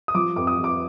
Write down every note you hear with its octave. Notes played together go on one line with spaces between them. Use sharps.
D#6
F3 D6
F2 D6
D#6
F2
D6